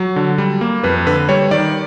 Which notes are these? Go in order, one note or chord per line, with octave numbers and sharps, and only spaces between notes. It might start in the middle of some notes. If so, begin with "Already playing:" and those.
Already playing: F#3
D3
G3
A#3
F2 B4
D3 B4
G3 C#5
D#3 D5